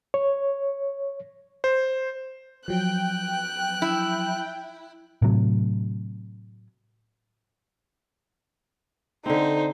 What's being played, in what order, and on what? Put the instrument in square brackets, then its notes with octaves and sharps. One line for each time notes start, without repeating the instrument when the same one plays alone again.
[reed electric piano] C#5
[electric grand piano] C5
[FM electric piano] F3 F#3 [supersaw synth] G5 [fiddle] F#6
[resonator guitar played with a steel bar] E4
[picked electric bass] A2 C3 F#3
[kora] D3 C4 [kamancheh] D#4 C5